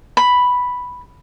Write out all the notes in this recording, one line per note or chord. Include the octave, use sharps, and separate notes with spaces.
B5